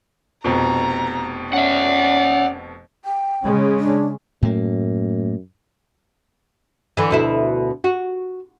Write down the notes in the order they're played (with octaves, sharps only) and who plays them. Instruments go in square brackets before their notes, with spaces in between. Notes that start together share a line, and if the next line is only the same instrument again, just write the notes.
[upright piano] F1 F2 B2 [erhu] A#5
[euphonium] C#4 [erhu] D5 [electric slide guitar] E5 F#5
[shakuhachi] G5
[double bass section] C#3 G#3 C#4
[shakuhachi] D4
[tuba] F#2 [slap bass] A2 A3 A#3
[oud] D3 E3
D2 B2 E4
F#4